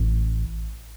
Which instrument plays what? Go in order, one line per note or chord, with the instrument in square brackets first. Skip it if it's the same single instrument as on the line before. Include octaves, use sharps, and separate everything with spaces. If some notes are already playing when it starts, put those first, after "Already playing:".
Already playing: [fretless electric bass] A1